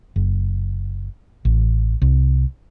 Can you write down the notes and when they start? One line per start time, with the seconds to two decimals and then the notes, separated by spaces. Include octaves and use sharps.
0.16 F#1
1.45 A1
2.02 C2